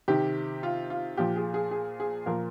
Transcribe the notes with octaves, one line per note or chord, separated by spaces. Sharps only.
C3 D#3 G4
F4
F4
A#2 F3 G4
G#4
G#4
G#4
G#4
A#2 F3 A#4